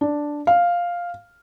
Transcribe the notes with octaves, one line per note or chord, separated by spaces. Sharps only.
D4
F5